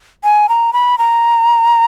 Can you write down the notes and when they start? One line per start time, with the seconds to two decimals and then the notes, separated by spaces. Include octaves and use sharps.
0.24 G#5
0.49 A#5
0.73 B5
0.98 A#5